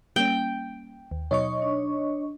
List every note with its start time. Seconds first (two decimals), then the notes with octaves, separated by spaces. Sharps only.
0.16 G3 A#3 C#4 G5
1.11 D#2
1.31 B2 F#3 D#4 C#5 D#5 C#6
1.62 D4